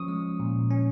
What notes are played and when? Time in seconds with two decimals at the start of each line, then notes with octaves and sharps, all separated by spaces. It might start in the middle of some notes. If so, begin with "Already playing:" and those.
Already playing: F3 C#4 C#6 D#6
0.08 G#3
0.40 A#2
0.71 C#4